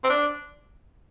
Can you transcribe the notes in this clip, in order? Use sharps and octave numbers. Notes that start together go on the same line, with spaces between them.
C4
D4